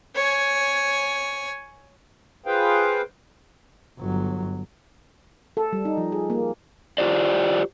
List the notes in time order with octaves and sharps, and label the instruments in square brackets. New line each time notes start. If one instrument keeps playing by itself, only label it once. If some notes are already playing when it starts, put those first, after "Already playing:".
[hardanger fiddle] C#5 G#5
[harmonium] F4 G#4 B4 C5 F5 G5
[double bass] G1 F#3
[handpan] A4
G3
D#4
F3
G#4
A#3
[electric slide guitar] F4 G4 C5 D5